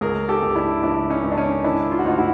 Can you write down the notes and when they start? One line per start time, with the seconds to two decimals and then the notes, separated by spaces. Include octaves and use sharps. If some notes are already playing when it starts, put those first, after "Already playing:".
0.01 C#2 G#4 A#4
0.29 G4 A4
0.43 C#2
0.55 D4 E4
0.83 C#2 D4 E4
1.10 C#4 D#4
1.24 C#2
1.32 D4
1.37 C#4 D#4
1.64 D#3 D4 E4
1.91 F4
1.99 F#4
2.05 D2 D#4 F4
2.18 E4 F#4